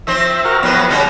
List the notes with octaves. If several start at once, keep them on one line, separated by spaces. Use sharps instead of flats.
F3 C4 C5 E5
F#4 A#4 F6
A2 F3 F#3 B3
C#3 G3 G#3